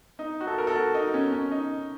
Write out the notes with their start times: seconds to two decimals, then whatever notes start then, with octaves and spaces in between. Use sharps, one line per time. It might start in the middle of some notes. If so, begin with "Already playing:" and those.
0.19 D#4
0.40 F#4
0.47 A4
0.58 A#4
0.67 A4
0.76 F#4
0.94 D#4
1.14 C#4
1.32 C#4
1.51 D#4